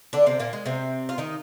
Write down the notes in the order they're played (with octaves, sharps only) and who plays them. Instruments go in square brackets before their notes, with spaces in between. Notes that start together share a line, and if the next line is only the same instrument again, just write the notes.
[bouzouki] D3 D4
C3 C4
A#2 A#3
G#3
C3 C4
F4
D#3 D#4